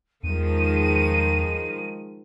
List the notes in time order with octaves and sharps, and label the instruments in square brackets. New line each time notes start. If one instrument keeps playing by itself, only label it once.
[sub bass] E2 [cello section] D#3 F3 G#3 [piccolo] D#7